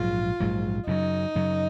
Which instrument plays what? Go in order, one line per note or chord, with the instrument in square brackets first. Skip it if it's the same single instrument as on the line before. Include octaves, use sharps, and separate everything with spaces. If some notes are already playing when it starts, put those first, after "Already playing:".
Already playing: [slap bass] A#1 G#2 F#3 [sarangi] F4
[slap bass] A#1 G#2 F#3
[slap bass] F#2 C#3 F#3 [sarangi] D#4
[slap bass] F#2 C#3 F#3